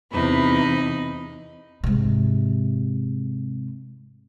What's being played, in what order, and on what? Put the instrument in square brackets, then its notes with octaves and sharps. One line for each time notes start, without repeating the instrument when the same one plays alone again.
[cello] E2 C3 [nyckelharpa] D#4 B5
[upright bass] G#2 C3